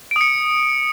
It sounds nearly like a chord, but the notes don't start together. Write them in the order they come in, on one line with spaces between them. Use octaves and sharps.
D7 D#6 C#7